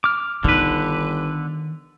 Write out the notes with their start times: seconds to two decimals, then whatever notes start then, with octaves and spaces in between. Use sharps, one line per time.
0.04 D6 F6
0.44 G1 D3 D#3 B4